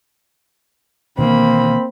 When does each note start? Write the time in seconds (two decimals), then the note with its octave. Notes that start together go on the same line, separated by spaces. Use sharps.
1.18 B2 D#3 E3 A#3 C4 B5